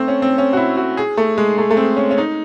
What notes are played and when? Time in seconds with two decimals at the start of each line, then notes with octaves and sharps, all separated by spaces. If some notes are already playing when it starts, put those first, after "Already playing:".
Already playing: A3 C4
0.08 C#4
0.22 C4
0.38 C#4
0.53 F#4
0.57 E4
0.77 F#4
0.97 G#4
1.17 A3
1.38 G#3
1.58 A3
1.71 A3
1.77 C4
1.97 C#4
2.11 C#4
2.18 D#4